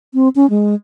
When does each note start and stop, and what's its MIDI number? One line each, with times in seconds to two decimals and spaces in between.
0.14 0.29 60
0.36 0.49 61
0.50 0.75 56